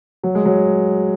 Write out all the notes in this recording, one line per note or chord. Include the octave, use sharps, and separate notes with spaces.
F#3
G#3
F#3